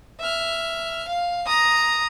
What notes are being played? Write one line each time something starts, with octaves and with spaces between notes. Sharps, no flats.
E5 F6
F5
A#5 D#6